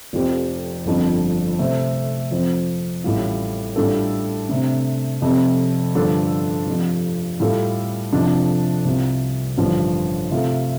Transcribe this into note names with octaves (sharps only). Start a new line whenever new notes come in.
F1 F2 F3 C4 G4
G1 F2 F3 D4
C3 A3 C4
F2 F3 C4
A1 A2 G3 F4
A2 G3 D4 F4 A4
C3 A3 D4
F1 F2 C3
G2 D3 F3 D4 A4
F1 F2 F3
A2 G3 F4 A4
F2 C3 F3 D4
C2 C3 G3 F4
A1 G2 D3 F3
C3 A3 F4 A4